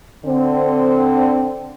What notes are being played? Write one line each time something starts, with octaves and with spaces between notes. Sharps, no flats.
D3 C4